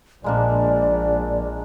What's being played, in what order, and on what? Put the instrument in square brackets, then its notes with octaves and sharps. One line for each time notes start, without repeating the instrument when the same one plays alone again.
[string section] A#1 [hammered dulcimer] G#3 A#3 D4 [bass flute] D5